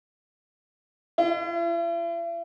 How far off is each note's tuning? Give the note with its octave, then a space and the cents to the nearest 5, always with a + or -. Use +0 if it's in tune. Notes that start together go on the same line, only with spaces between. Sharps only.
E4 +45